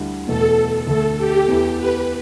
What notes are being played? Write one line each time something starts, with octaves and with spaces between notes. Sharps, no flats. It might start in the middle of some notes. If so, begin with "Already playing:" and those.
Already playing: D2 D3 G3 E4
E2 B2 A3 A4
D2 D3 A3 A4
G4
E2 E3 B3 E4
B4